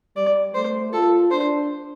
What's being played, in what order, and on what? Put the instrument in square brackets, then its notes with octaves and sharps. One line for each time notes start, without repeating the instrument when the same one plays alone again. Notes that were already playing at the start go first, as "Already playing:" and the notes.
[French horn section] G3 [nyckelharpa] D5
[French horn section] A3 [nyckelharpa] C5
[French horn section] F4 [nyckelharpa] A4
[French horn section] D4 [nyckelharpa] C5